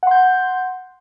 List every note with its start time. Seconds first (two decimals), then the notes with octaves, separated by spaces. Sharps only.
0.03 F#5
0.07 C6
0.11 G6